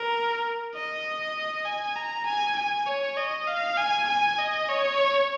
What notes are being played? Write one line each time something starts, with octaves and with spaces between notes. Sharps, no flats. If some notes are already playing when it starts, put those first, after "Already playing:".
Already playing: A#4
D#5
G#5
A#5
G#5
G#5
C#5
D#5
F5
G#5
G#5
D#5
C#5